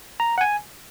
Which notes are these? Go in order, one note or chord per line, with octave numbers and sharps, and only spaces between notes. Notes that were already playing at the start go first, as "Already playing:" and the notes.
A#5
F#5
G#5